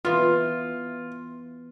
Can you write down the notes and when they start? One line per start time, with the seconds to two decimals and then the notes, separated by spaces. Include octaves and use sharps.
0.05 E3 B3 F4